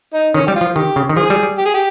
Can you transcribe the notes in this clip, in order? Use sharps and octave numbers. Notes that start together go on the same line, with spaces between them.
D#4
D#3 C#4
G3 G4
F4
F3
D#3 G4
C#3
D#3
F3 G#4
G3
G3
G4
G#4
G4